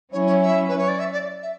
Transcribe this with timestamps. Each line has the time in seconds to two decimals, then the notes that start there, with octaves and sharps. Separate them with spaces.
0.12 F#3 C#4 E4 C#5
0.26 C#5
0.42 E5
0.68 B4
0.78 C#5
0.88 D5
0.99 E5
1.12 D5
1.42 E5